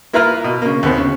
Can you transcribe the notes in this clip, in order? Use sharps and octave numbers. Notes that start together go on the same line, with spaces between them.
A#3 E4 F4 B4 A#5 F6
B2
C#3 A#3
D#2 B3 C4
C#3